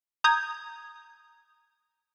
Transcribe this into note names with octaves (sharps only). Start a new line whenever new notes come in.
A#5 D#6 G6 G#6